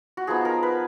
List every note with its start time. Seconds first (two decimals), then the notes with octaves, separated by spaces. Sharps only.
0.17 F#4
0.27 F3 B3 D#4 G#4
0.45 A#4
0.63 B4